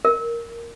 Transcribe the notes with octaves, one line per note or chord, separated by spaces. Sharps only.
A#4